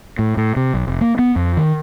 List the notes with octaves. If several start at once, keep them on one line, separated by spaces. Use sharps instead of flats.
A2
A2
C3
B1
F1
A#3
B3
F2
D#3